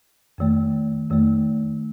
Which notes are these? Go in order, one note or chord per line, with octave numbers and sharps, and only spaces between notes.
F2 D#3 A3
F2 D#3 A3